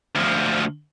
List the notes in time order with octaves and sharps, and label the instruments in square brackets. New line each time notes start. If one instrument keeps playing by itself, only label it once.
[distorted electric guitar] D2 F3